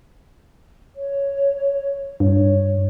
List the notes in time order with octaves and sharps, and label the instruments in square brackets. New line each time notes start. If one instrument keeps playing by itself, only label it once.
[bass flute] C#5
[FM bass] G2 [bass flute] C#5